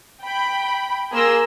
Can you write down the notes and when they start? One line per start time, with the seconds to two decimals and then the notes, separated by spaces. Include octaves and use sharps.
0.24 G5 B5
1.11 A#3 G#4 A#4 C6 E6 A#6